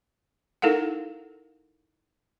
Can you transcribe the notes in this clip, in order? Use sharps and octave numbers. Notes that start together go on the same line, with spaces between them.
D#4 E4 A4 A#4 F5 F#5